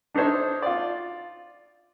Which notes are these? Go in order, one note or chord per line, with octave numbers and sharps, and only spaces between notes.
D4 D#4 A4 C5 C#5
F4 D5